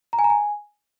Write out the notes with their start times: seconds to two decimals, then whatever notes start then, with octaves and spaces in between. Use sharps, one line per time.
0.13 A#5
0.19 G#5
0.24 A#5
0.30 G#5